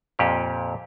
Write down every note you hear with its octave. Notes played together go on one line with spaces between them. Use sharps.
F2 A#2 G4